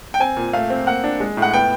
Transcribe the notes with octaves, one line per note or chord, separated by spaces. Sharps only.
G5
C4 G#5
A#2
A3 F5
C4
A#3 F#5
D4
G#3
A2
F#5
B3 G5